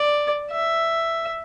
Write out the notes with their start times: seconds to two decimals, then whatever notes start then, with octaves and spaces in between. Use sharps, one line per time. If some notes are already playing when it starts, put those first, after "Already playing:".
Already playing: D5
0.51 E5